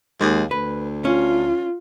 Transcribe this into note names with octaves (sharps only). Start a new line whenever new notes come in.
D#2 G#3
D2 B4
C#4 F4